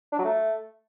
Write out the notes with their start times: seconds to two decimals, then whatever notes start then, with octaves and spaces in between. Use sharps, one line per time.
0.12 D4
0.18 F#3
0.24 A3